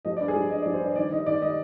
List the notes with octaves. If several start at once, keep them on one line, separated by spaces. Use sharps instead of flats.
F3 D#5
D5
G2
G#4
F3
G2 D#5
D5
F3
C5
G2 D5
D#3 D5
D#3 D#5
D#3 D5
D#3 D#5